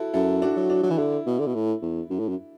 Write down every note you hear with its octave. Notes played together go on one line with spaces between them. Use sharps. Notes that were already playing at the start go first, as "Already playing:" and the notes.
Already playing: E4 F#4 A4
F#2 E4 A4
D4 F#4
F#3
D4
F#3
E3
D3 E4
B2
D3
B2
A2
E2
F#2
A2
F#2